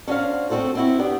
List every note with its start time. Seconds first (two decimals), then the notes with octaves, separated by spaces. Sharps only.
0.08 C#4 D4 F#4 C5 F5
0.50 A3 C4 D4 F#4 A4 C5
0.75 C4 E4 F#4
0.99 B3 D4 G4